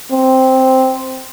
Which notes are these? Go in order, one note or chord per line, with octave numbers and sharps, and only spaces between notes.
C4